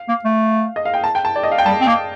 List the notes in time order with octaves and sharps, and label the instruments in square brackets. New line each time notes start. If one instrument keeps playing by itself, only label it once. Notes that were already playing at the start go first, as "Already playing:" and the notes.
Already playing: [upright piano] F5
[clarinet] A#3
A3
[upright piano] D#5
F5
G5
A5
G5
A5
D5
D#5
F5
G5
[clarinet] G3 [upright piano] A5
[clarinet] C4
A#3